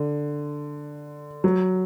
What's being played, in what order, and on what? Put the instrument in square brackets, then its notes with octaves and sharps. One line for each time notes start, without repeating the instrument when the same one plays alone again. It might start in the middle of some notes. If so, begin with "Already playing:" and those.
Already playing: [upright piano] D3
F#3